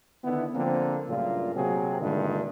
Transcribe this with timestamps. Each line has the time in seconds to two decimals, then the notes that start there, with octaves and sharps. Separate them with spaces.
0.23 D3 D#3 B3 E4
0.54 D3 F3 A#3 C4
1.08 G2 A#2 C#3 F#3 A3 F4
1.54 C3 F#3 A#3 C4 G4 G#4
2.00 G2 A#2 D3 D#3 G#3 A3